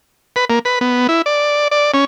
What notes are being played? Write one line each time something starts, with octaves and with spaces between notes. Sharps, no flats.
B4
A#3
B4
B3
E4
D5
D5
C#4